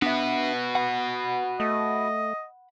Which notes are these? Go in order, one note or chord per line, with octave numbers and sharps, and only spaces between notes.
B3 D4 F#4 B4 E5
F#5 B5
A3 D#5